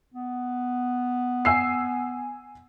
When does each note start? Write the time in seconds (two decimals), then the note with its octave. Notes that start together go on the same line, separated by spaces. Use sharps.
0.14 B3
1.45 G#5 E6 C7